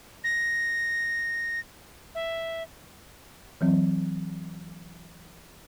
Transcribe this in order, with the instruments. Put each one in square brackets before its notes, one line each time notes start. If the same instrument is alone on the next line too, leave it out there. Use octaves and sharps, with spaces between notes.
[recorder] A#6
E5
[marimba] E3 F#3 C4